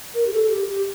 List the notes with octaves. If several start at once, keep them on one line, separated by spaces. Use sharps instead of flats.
A#4
G4
A4
A4
G4
G4